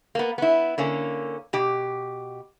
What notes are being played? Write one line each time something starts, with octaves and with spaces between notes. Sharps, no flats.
A#3 B3
B3 E4
D3 A#3 C#4
B2 G4